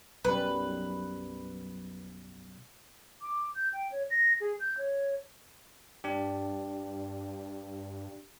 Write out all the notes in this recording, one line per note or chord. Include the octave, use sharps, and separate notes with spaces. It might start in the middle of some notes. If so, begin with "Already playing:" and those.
B1 F#2 G3 B4
D6
G6
G5
C#5
A#6
G#4
G6
C#5
G2 D4 G4